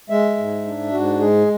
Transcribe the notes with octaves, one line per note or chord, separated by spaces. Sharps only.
G#3 E5
G#2
D4
G#2 F#4
G#3 G#4